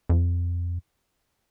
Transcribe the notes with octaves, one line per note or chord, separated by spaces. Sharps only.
F2